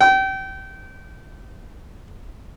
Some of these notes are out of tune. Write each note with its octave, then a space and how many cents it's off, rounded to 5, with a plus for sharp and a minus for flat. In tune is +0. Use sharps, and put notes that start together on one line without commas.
G5 -30